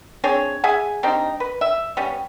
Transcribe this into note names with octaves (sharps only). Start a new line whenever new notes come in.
C4 D4 G#4 C#5
G#4 E5 F#5 G#5
G3 C4 D4 D#4
B4
E5
G3 B3 C#4